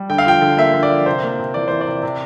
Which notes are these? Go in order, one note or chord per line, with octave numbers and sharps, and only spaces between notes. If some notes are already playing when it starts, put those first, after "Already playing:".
Already playing: G3
D3 G5
F5
F3 G5
D3
A#3 E5
D3
D5
F3
C3 C5
A#3
C3
E3 D5
E3 C5
D5
C3
C3